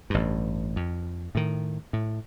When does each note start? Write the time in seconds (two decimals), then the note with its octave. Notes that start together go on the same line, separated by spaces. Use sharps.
0.10 A1 G2
0.76 F2
1.35 A2 D#3
1.93 A2